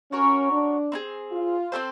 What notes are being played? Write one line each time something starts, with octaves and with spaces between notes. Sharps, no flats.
C#4 F#4 A#4 C#5
D4
C4 D#4 G#4
F4
C4 E4 A4 C5